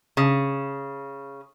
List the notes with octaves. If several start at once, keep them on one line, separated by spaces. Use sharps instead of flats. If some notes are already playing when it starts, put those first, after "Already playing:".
C#3